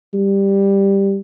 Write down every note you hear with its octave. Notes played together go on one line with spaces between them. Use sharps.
G3